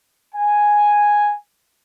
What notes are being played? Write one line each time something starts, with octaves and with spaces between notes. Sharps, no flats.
G#5